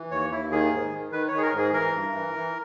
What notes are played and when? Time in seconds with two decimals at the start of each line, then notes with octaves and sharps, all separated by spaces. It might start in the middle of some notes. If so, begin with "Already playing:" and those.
Already playing: E3
0.11 D#2 C#5
0.31 D#2 E4
0.52 D#3 G#4
0.72 G#2
0.92 D#3
1.12 D#3 B4
1.28 D#3 C#5
1.38 G#4
1.42 A#4
1.52 G#2
1.58 G#4
1.73 E3 A#4
1.93 G2
2.13 E3
2.34 E3